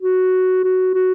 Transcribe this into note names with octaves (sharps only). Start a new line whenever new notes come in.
F#4
F#4
F#4